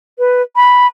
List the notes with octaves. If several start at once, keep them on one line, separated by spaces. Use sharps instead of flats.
B4
B5